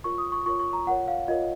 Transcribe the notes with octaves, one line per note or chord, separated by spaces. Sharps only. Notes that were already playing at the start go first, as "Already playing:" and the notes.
F4 A#4 C#5 C#6
D#6
C#6
F4 A#4 C#5 C#6
C#6
A#5
F4 A#4 C#5 F#5
F5
F4 A#4 C#5 D#5